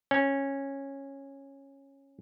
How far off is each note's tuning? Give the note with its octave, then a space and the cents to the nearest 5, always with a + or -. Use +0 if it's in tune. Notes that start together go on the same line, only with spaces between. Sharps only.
C#4 -10